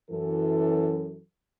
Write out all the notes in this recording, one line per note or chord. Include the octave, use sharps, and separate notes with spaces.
F#2 E3 A4